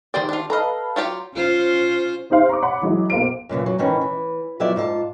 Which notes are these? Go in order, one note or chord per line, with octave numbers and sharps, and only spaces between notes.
D#3 G4 G#4 C5 D5
D4 F4
A4 B4 D#5 F5 A#5
F#3 F4 G4
C#4 F4 C5
C4 D#4 G4 C5 F5
A#5 C#6 D6
C#5 F#5 B5
E3 F#3 G#3 E4
B1 A#3 C5 D7
F#2 A#2 C#3 E3
F#3
G#2 D#3 E3 C#4
E3
F3 F#3 B3 E4 D5 E5
G#2 F4 C5 A5